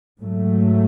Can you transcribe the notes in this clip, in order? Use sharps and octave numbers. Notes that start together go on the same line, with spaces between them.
G#2 F#3 A3